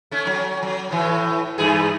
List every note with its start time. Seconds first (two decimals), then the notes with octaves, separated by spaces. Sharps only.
0.11 A3 C#4
0.26 F#3 C#4
0.63 F#3
0.91 A2 E3
1.58 G2 E3 G#4